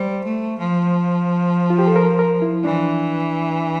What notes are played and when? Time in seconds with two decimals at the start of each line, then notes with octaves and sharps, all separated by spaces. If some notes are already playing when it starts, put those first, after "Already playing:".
Already playing: G3 C5
0.24 A3
0.59 F3
1.70 F4
1.79 G4
1.87 A4
1.96 A#4
2.19 A#4
2.42 E4
2.64 E3 D4